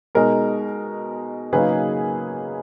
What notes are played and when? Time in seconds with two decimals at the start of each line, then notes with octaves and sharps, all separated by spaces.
0.15 B2 G#3 D#4 A#4
1.53 C#3 F#3 A#3 D#4 G#4 B4